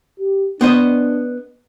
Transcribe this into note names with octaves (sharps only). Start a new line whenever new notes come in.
G4
B3 D4 C5 D#5